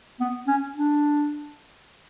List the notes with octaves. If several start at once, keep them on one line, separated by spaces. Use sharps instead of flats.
B3
C#4
D4